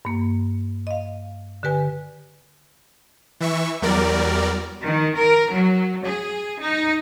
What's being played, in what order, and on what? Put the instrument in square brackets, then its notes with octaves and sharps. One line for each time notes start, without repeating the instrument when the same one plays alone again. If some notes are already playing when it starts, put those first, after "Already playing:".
[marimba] G2 A#3
D#5 F5
D3 G4 B4 G#5
[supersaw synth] E3 E5 C#6
E2 F#3 G3 A#4 D5
[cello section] D#3
A#4
F#3
G#4
D#4